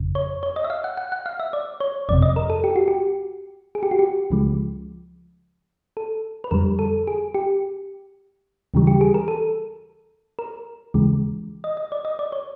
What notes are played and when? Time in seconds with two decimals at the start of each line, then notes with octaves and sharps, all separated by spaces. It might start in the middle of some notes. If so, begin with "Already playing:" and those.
Already playing: G1 F2 C#3
0.15 C#5
0.43 C#5
0.56 D#5
0.64 E5
0.70 F5
0.84 F#5
0.97 F#5
1.12 F#5
1.26 F5
1.40 E5
1.53 D5
1.80 C#5
2.09 G1 F2 C3 D5
2.22 D#5
2.36 A#4
2.50 A4
2.64 G4
2.76 F#4
2.88 G4
3.75 G#4
3.83 G4
3.91 F#4
3.99 G4
4.30 C#2 C#3 F3 G#3
5.97 A4
6.44 B4
6.51 F2 D3 G3 A#4
6.79 A4
7.07 G#4
7.34 G4
8.74 D#2 C#3 E3 G3
8.87 G4
9.01 G#4
9.14 A#4
9.28 A4
10.39 A#4
10.94 D#2 C#3 E3 G#3
11.64 D#5
11.77 D#5
11.92 D5
12.05 D#5
12.19 D5
12.32 C#5